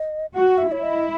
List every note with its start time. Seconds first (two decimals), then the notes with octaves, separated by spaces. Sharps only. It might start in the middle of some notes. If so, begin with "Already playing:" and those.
Already playing: D#5
0.34 F#4 F#5
0.58 E5
0.71 E4 C#5
0.83 D#5